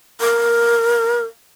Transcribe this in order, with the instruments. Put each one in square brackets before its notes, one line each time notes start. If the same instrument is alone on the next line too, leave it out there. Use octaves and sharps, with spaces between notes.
[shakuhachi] A#4